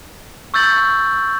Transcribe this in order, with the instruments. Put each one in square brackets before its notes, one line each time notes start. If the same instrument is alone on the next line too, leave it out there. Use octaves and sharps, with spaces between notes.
[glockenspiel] C#6 E6 G6 A6 F#7